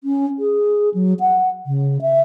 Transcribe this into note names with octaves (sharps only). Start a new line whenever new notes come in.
C#4
G#4
F#3
F#5
C#3
E5